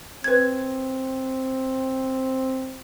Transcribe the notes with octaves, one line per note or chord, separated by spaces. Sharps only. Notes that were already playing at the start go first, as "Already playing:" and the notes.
C4 B4 G#6